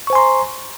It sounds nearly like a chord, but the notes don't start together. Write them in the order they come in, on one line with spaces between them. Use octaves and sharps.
C#6 C5 G#5 C6 A#5